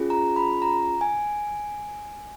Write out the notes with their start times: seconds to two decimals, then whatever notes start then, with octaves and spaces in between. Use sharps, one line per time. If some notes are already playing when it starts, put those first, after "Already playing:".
Already playing: C#4 F4 G#4
0.10 A#5
0.36 B5
0.62 A#5
1.01 G#5